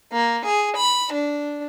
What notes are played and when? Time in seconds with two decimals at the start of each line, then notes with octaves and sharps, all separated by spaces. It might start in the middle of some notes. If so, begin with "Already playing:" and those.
0.12 A#3
0.45 G#4
0.77 B5
1.13 D4